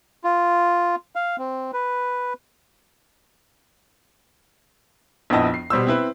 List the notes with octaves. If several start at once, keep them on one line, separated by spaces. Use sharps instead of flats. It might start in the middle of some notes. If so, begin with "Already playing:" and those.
F4
F5
C4
B4
A#1 F2 B3 E4 D#5 A5
C7
B2 G3 C5 E6
C4 E4 B4